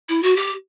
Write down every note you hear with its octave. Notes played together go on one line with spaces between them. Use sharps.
E4
F#4
G4